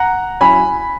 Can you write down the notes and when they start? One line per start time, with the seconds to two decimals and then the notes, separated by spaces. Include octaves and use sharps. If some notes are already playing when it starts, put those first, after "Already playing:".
Already playing: F#5 A#5
0.41 F#3 C#4 E4 G#5 B5